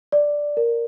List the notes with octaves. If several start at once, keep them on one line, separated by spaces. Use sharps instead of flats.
D5
A#4